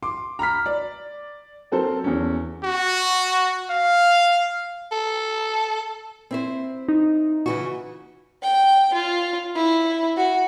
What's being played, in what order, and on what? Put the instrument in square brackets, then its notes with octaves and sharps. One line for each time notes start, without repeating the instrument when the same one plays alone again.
[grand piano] C6 D6
A#5 B5 F6 B6
D5
F#3 C4 A4 A#4 C5
E2 C#4
[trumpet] F#4
F5
[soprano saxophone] A4
[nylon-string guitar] C4 E4 C5
[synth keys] D#4
[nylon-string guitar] C#3 E3 F#4
[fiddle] G5
F4
E4
F#4